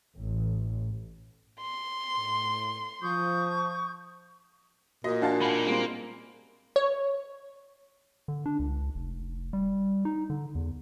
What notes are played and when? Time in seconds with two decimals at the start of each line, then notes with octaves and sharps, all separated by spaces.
0.17 A1
1.61 C6
2.16 A2
3.02 F3 C#6 D#6 G6
5.04 A#2 F#4 D#5
5.22 D4 E4 F#4 D5 F5 A5
5.41 G#3 D#4 G#5 B5
5.66 G3 G#3 A#3 C4
6.76 C#5
8.28 D3
8.46 D4
8.59 C#2
8.95 F1
9.53 G3
10.05 D#4
10.30 D3
10.55 E2